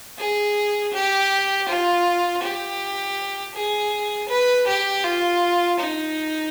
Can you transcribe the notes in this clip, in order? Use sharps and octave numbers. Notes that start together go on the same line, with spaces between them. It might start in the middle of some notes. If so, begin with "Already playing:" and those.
G#4
G4
F4
G4
G#4
B4
G4
F4
D#4